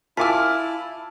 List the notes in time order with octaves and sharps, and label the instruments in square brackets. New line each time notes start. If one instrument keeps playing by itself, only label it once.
[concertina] E4 [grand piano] F4 G#5 [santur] A5 D6 E6 [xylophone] F6 B6